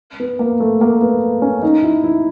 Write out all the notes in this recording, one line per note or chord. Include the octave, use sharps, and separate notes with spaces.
B3
A#3
A3
A#3
B3
C#4
D#4
E4
E4